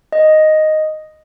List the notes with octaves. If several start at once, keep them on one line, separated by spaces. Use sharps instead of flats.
D#5